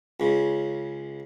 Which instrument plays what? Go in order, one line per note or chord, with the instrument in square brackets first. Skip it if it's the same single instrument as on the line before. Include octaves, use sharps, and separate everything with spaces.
[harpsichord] C#2 C#3